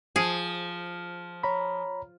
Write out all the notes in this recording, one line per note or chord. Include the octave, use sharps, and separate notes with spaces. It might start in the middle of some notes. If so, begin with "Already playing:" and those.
F3 G#4
C#5 A#5 B5